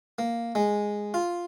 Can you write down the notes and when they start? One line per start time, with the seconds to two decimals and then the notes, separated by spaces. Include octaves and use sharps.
0.19 A#3
0.55 G#3
1.14 F4